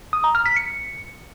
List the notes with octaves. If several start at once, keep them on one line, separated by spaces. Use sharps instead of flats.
D#6
A#5
F6
B6
C#7